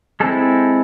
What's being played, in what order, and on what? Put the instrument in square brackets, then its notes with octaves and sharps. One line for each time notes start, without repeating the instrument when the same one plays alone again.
[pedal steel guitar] G#3 C4 E4 A4